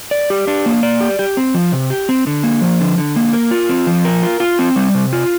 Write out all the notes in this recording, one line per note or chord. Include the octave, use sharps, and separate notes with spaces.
D5
G4
D4
A#3
D5
G4
G4
C4
F3
C3
G4
C4
D3
A#3
F3
D3
D3
A#3
A#4
F4
C4
F3
A#4
F4
F4
C4
G3
C3
F4